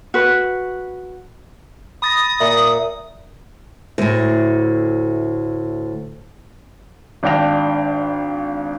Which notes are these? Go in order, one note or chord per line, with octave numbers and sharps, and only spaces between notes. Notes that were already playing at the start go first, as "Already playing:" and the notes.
F#4 B4
B5 D#6 A6 A#6
A#2 E5
D2 A2
G#1 D4 F5 G5 A#6 F7